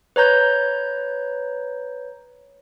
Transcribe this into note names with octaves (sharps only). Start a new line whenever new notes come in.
B4 C#5 A#5 G6